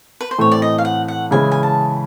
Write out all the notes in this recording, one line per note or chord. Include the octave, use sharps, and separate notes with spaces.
B4
C5
A2 E3 A3 C4 C#5
D5
D#5
F5
F#5
F#5
C#3 E3 G#3 C#4 E4 G#5
G#5
A5